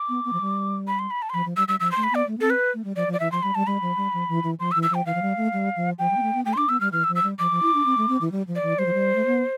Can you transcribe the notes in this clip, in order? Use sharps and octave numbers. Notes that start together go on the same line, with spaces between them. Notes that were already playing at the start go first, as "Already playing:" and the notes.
Already playing: D6
B3
B3
F3
G3
B5
C6
B5
A5
C6
F3 B5
F3
G3 E6
G3 E6
F3 E6
A3 C6
B5
B3 D5
A3
B3
C4 A4
B4
A3
G3
F3 D5
F3
D5
E3 E5
F3 C6
G3 B5
G3 A5
G3 B5
F3
G3
F3
E3
E3
F3 C6
E6
E3
E6
F3 G5
E3 F5
F3
G3
A3
G3
F3
F3 G5
G3
B3
A3
B3
A3 G5
C6
D4 D6
B3 E6
G3 F6
E3 F6
E6
F3
E6
G3
F3 D6
F3
E4
D4
C4
A3
C4
E3
G3
F3
D5
E3
G3 C5
F3
G3
A3
B3